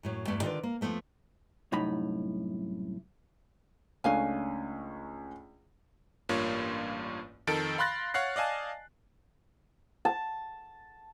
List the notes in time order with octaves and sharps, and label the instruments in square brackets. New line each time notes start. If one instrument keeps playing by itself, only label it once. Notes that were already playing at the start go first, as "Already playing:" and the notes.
[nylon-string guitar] F#2 A2 F#3
E2 G2 A3
D3 D#3 F4 A#4 B4 D5
A#3
F2 D3 F3 A3 B3
[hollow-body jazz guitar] C2 F#2 A2 D#4 B5
[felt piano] C#2 A3 C#4 [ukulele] D4 F5 G#5
[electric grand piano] A1 G2 A#3 F4 C#5
F2 D#3 A4 A6 D7
F5 B5 C6 F#6 A6 A#6
C#5 F5 F#5 F#6 C7
D5 D#5 F5 G#5 A5
[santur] A5